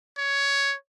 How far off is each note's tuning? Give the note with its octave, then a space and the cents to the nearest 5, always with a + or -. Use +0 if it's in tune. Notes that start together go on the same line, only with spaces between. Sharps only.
C#5 +10